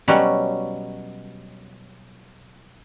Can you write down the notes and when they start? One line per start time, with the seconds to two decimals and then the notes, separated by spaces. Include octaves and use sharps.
0.08 B2 F#3 G3 C#4 F#4